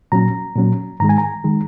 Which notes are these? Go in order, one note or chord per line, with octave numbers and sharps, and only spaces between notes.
A#2 F#3 C#4 A#5
A#2 F#3 C#4
G#2 D#3 G#3 A#5
G#5
A#5
D#3 G#3